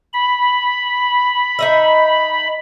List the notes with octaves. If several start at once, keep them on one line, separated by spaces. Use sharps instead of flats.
B5
D#4 D#5 E5